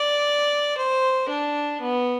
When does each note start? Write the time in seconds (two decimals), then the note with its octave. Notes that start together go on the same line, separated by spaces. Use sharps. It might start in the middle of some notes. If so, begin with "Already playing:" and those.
Already playing: D5
0.78 C5
1.29 D4
1.81 B3